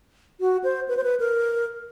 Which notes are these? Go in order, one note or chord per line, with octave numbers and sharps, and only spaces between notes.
F#4
C5
B4
C5
B4
A#4